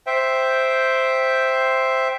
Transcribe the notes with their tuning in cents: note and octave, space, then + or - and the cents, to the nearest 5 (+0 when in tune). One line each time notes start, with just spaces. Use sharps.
C5 +0 E5 +0 G5 +0